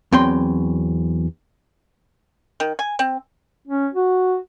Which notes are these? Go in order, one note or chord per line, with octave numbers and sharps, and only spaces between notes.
E2 F#3 C4 G5 C6
D#3
G#5
C4
C#4
F#4